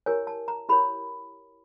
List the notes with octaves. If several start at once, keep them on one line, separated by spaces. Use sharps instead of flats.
E4 G4 A#4 C#5 G#5
A5
A#5
E4 G4 A#4 C#5 B5